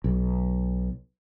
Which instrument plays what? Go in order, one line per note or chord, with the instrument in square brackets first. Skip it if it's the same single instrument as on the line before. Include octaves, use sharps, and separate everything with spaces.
[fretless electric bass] B1